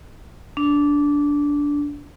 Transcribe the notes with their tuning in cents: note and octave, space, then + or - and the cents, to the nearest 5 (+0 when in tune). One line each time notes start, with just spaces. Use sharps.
D4 -15